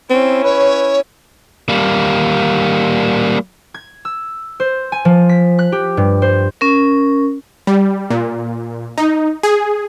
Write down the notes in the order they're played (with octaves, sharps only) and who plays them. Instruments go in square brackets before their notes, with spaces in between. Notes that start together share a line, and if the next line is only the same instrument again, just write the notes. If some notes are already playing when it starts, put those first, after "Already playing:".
[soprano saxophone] C4 [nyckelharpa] C#4 E4
[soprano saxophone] B4 [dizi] C#5
[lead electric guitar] G3 A#3
[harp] G#6
E6
C5
G#5
F3
B6
F#6
G4
G2
C5
[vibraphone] C#4 A#4
[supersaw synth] G3
A#2
D#4
G#4